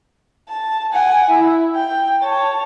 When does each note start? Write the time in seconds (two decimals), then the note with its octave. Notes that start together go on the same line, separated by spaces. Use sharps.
0.49 A5
0.93 F#5 G#5
1.31 E4
1.75 G5
2.23 C#5 A5